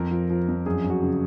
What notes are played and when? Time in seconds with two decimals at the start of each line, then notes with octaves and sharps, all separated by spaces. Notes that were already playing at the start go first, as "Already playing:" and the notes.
Already playing: F2 A#4
0.11 F3
0.30 F3
0.48 F2
0.66 F#2 G#4
0.84 F#2
0.90 F#4
1.03 C#3